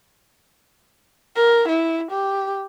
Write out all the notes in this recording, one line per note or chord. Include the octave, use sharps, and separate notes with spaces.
A#4
E4
G4